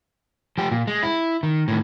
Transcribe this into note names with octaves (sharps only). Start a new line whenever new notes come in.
F3 G4
A#2
G#3
E4
D#3
A2 D#3